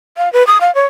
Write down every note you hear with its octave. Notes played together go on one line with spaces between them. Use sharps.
F5
B4
D#6
F5
C#5